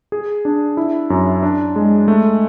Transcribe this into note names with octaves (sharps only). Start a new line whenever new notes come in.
G#4
D4
E4
F#2
D4
G#3
A3